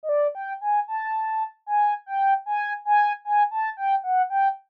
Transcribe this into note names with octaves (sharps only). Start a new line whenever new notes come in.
D#5
D5
G5
G#5
A5
G#5
G5
G#5
G#5
G#5
A5
G5
F#5
G5